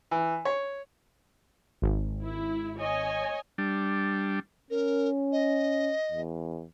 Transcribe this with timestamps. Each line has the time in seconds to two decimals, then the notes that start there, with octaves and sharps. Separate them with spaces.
0.11 E3
0.45 C#5
1.82 G#1
2.22 E4
2.80 C#5 D#5 G#5
3.58 G3 D4
4.70 C#4 A#4
5.32 D#5
6.11 E2